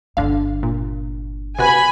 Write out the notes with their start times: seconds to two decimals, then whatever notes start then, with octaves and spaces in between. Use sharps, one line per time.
0.17 G1 D3 D4 F5
0.63 A#2
1.58 C3 F#4 B4 G#5 B5